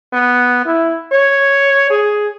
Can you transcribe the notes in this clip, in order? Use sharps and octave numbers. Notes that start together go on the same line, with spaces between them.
B3
E4
C#5
G#4